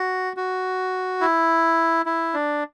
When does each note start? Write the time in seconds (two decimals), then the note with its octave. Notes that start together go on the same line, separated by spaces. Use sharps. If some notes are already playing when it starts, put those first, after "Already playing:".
Already playing: F#4
0.37 F#4
1.21 E4
2.06 E4
2.34 D4